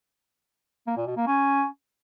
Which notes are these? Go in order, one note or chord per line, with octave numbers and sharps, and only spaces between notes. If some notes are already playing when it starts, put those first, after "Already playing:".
A#3
A#2
B2
A#3
C#4